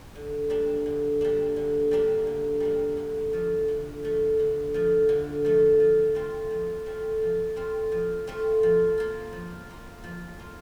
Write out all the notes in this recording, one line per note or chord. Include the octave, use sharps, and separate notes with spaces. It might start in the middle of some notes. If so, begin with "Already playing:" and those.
D3
G3 A#3 D4
D3
G3 A#3 D4
D3
G3 A#3 D4
D3
G3 A#3 D4
D3
F3 A3
D3
F3 A3
D3
F3 A3
D3
F3 A3
F3
A3 C4 F4
F3
A3 C4 F4
F3
A3 C4 F4
F3
A3 C4 F4
F3
A#3 F4
F3
A#3 F4
F3
A#3 F4